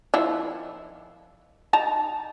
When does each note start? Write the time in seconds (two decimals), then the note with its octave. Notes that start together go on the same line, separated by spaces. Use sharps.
0.14 D#3 F3 E4
1.73 D#4 A5 A#5